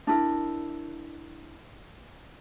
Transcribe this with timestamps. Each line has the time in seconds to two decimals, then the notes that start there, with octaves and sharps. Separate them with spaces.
0.07 D4 E4 A#4